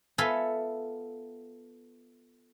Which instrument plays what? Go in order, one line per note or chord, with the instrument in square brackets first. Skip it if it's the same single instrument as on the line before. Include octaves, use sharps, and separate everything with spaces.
[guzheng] B3 F4 A4 E5 F5 G#5